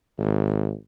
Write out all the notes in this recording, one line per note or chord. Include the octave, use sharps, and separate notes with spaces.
G#1